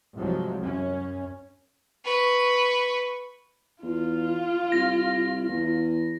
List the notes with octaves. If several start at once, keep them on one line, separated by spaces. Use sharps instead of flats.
C2 G#2 F3 F#3 G#3
F#2 C#4
B4 C#6
E2 F4
C2 A#6
E2